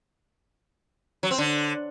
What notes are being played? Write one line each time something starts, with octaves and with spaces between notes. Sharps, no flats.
F#3
C4
D3